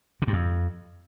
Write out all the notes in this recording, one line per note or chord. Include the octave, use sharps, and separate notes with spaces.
C3
G2
F2